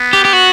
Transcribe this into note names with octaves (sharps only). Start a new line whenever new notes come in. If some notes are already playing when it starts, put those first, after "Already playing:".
Already playing: B3
G4
G4
F#4